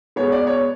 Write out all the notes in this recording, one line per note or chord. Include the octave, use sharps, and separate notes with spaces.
B2 G#3 B3 C#5
D5
C#5